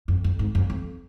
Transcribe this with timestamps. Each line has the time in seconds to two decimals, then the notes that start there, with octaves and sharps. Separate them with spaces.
0.08 F2
0.24 F2
0.39 G#2
0.55 F2
0.70 F2